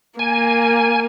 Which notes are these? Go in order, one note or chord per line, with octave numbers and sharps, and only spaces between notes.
A#3 G#5